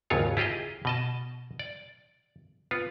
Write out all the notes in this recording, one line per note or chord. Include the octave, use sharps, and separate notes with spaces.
G#1 D#2 C#3 F#3 F4 C#5
E4 F4 G4 G#4 D#5
B2 D#5 A5
D5
B3 F4